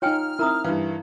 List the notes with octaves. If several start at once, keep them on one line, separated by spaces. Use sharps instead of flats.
D#4 F4 C#5 G5 G#5 F6
C4 D#4 E4 A#4 A#5 D#6
G2 E3 F5